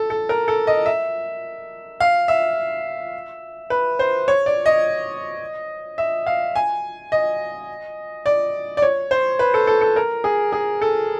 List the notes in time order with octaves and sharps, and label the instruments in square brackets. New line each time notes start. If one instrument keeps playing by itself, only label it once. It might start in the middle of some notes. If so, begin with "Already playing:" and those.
Already playing: [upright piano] A4
A4
A#4
A4
D#5
E5
F5
E5
B4
C5
C#5
D5
D#5
E5
F5
G#5
D#5
D5
D5
C#5
C5
B4
A4
A4
A4
A#4
G#4
G#4
A4